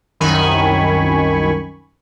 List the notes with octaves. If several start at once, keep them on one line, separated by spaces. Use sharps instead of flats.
C2 F#2 D#3 G#5 B5 C#6